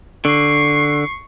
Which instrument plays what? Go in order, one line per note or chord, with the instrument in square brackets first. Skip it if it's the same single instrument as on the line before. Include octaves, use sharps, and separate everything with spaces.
[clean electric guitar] D3 [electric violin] C#6 C7